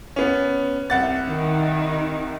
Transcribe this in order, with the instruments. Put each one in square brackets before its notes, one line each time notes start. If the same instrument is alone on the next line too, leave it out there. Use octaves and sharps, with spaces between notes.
[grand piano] B3 C#4
C2 F#5 A6
[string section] D#3